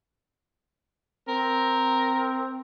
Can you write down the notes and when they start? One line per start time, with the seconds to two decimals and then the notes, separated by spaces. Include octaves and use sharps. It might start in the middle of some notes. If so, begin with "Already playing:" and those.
1.28 C4 A#4